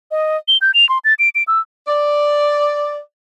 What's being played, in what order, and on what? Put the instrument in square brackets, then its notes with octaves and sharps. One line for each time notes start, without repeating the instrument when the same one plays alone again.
[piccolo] D#5
G7
G6
F7
C6
A6
D7
D7
E6
[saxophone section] D5